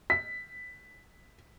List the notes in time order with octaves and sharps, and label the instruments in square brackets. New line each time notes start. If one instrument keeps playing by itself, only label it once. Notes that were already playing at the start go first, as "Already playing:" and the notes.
[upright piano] B6